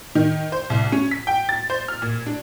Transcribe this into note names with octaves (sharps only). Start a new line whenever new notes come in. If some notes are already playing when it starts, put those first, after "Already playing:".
D#3
C5
C2
C#4
B6
G5
A6
C5
F6
A#2
D4